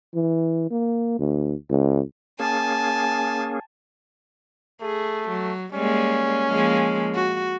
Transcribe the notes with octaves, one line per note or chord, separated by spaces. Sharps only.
E3
A#3
D2
C#2
A#3 C#4 G#4 G#5 A5
A3 G#4
F#3
G3 G#3 A#3 C#4
F3 G#3 A#3
F#4